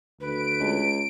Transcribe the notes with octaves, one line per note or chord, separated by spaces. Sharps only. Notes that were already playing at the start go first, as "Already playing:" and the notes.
D2 B4 D7
C#2